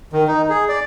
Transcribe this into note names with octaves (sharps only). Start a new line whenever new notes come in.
D#3
D#4
G#4
D5